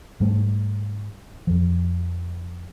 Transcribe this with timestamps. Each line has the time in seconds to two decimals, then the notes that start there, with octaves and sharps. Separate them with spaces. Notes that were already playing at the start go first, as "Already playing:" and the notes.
0.20 G#2 G3 A3
1.47 F2 F3